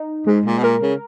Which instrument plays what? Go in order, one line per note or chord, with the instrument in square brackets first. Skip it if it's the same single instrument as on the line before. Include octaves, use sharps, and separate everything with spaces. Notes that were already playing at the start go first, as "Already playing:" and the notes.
Already playing: [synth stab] D#4
[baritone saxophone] G#2 [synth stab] G#3
[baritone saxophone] A#2
B2
[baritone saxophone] A#2 [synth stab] A#4
[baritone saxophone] C#3